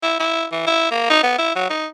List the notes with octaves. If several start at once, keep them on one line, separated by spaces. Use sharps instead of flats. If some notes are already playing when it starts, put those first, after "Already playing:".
E4
E4
E3
E4
A#3
D#4
B3
E4
F#3
D#4